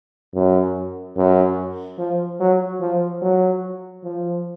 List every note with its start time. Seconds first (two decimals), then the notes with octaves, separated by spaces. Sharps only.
0.34 F#2
1.16 F#2
1.98 F3
2.40 F#3
2.81 F3
3.21 F#3
4.04 F3